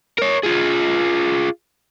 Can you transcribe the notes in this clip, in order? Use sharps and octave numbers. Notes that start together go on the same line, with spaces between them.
A#4 C#5
F4 G#4